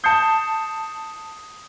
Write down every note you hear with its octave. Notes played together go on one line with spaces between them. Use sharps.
A5 D#6 G6 C7 C#7